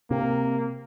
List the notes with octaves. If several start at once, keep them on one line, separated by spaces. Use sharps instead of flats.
C3 A#3